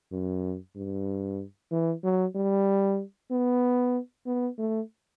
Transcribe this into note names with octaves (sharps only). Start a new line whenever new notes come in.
F#2
G2
E3
F#3
G3
B3
B3
A3